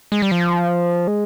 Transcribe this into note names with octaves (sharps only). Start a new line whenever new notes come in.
G#3
G3
F3
G#3